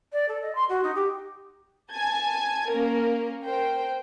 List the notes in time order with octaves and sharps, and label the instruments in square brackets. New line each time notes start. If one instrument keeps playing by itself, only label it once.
[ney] D5
A4
D#5
C6
F#4
D#4
G4
[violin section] G#5 A5 G#6
A#3 C#4 A#4
A#4 C5 G5